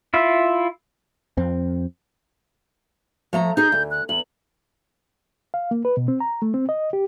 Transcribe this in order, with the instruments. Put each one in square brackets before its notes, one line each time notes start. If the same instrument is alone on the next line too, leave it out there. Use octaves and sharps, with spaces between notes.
[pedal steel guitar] E4 F4 E5
[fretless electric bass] F2 C4
[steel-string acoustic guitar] F3 A3 A#5
[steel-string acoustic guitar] D#4 G#4 [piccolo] G6
[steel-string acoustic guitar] D2
[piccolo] F#6
[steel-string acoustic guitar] E2 [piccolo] F#7
[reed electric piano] F5
A#3
B4
B2
C4
A#5
A3
C4
D#5
G4